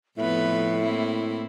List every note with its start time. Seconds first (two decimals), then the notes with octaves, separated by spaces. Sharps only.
0.18 F2 A2 B3 B4 E5
0.83 A#3 C4 E4